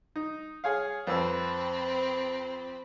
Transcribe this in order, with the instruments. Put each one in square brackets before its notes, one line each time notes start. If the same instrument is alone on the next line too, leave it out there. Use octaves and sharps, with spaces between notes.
[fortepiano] D#4
G#4 C#5 F5
[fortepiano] F2 B4 E6 [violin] C4 B5